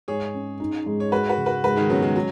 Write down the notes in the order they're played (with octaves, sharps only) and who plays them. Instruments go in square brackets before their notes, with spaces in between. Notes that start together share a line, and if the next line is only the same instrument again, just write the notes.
[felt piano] G#2 [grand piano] G#4 C#5
[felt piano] C#4
D#4
G#2
[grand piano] C#5
[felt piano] G#3 [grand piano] F#4 B4
[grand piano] F#4 B4
[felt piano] C#3
[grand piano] F#4 B4
[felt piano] G#2 [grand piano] F#4 B4
[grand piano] D#3 G#3
[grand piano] F#3 B3 [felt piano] C#4
[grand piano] D#3 G#3
[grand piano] F#3 [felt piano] F#4